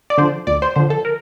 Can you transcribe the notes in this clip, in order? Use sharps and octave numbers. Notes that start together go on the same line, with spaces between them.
D5
D3 F3 C5
D2 D5
C5
D3 F3 C5
A4
A#4